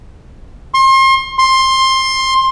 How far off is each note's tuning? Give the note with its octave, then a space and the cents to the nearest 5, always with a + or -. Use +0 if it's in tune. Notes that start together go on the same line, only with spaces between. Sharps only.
C6 +35
C6 +15